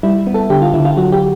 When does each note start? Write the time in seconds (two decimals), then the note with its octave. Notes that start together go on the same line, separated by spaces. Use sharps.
0.03 G3 E4
0.27 B3
0.34 A4
0.50 D3 G4
0.62 F4
0.74 D3 E4
0.85 F4
0.97 F#3 F#4
1.12 G4